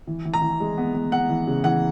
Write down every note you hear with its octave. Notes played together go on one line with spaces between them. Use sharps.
E3
E3
A#5
E3
G#3
B3
B3
B3 F#5
E3
C#3
E3 F#5